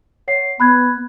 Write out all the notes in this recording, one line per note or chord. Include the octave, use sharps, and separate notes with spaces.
C#5 F#5 C7
B3 B5 F#6 G#6